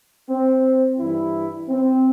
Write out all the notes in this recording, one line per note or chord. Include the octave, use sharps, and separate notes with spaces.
C4
G2 E3 G3 E4
C4